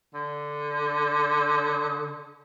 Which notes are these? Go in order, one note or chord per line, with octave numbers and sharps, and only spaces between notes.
D3